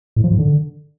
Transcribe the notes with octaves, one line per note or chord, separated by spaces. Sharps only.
A2
F3
G#2
D3